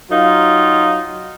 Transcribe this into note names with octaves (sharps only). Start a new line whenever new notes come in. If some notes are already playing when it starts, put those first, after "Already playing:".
F#3 D#4 F4